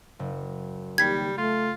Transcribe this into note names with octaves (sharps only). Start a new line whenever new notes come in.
F#1
D#2 G3 G5 G#6 B6
A3 F4